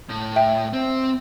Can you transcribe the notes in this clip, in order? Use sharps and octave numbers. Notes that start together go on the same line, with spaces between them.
A2
E5 G5
C4